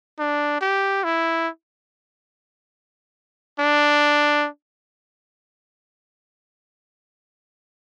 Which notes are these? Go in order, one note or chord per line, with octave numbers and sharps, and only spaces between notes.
D4
G4
E4
D4